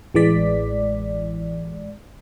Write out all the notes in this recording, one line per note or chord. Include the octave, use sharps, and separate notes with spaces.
A1 E3 G#3 D5 B6